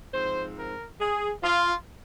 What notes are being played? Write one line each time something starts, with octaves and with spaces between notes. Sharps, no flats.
G#2 F3 C4 C5
A#4
G#4
F4